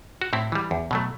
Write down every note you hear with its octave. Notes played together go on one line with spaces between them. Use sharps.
F#4
A2 C4 E4
E3 G3
E2
B2 F#3 A3